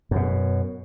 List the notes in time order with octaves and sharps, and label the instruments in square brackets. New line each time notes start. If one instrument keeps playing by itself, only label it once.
[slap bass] F#2 B2